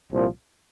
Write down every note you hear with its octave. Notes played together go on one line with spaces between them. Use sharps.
C2 A#2 F3